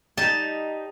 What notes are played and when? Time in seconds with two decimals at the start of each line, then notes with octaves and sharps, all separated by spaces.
0.18 G3 D#4 A5